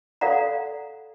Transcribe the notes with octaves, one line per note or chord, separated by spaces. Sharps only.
A4 D5 F5 F#5 A#5